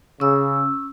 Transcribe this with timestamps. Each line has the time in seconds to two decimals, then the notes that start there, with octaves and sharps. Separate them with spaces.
0.20 C#3 C#4 E6